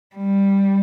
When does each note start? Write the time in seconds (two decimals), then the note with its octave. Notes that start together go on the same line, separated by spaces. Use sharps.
0.16 G3